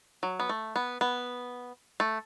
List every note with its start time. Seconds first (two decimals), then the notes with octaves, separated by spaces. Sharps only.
0.23 F#3
0.40 B3
0.49 A3
0.76 B3
1.01 B3
2.00 A3